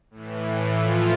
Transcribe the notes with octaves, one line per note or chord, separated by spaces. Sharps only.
A2 E3
F3 F4